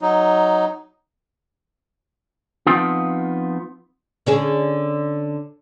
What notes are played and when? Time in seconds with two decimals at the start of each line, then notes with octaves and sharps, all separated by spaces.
0.02 F#3 D#4
2.67 F3 G3 B3 C4 D#4 F4
4.27 D3 C#4 G#4